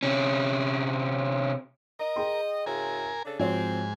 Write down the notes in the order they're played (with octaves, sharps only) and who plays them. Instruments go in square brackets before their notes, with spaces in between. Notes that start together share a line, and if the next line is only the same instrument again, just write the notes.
[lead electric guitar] C3 C#4
[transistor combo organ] A#4 [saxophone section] D#5
[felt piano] G#4 G5 C6
[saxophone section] C#3 E4 F#4 [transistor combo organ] A#4 G#5
[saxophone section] C#3 D4 A4
[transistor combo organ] G#2 G#5 [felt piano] F3 F#4 C#5 [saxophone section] C4